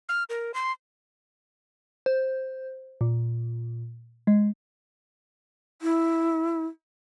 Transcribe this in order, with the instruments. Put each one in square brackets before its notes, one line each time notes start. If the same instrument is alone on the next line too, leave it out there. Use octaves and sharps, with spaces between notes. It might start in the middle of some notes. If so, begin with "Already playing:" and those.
[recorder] F6
A#4
C6
[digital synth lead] C5
A#2
G#3
[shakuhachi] E4